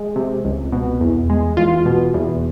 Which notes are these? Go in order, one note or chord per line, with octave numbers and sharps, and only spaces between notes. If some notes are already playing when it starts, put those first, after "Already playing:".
Already playing: G#3
C3
C#2
B2
E2
G#3
E2 F4
B2
E2